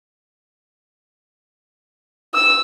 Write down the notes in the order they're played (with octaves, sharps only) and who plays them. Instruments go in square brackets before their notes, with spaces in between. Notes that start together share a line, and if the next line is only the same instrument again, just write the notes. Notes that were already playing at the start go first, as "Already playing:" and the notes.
[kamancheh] E6